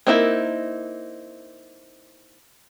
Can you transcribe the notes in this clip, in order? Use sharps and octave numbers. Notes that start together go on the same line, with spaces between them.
A#3 C4 D#4 E4 A#4